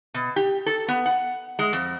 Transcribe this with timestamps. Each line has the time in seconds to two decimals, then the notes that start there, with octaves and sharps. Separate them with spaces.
0.14 B2
0.36 G4
0.66 A4
0.88 B3
1.06 F#5
1.59 G#3
1.73 F2